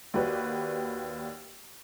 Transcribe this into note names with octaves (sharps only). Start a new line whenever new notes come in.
D#2 F#4 G4 B4 D5